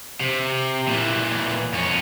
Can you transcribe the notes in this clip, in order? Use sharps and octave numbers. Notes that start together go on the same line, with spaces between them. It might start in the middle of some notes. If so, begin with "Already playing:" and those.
C3
A#2 E3
F2 C#4